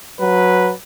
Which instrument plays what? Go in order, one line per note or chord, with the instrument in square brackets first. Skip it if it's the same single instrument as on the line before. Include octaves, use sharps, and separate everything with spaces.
[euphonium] F#3 [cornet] B4